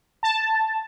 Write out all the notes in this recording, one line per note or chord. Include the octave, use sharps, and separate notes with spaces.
A5